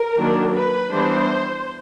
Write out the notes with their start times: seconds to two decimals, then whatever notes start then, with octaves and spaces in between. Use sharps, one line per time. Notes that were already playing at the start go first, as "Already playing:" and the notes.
Already playing: A#4
0.16 D#3 F#3 A#3 D4
0.53 B4
0.91 E3 G3 B3 D4 C5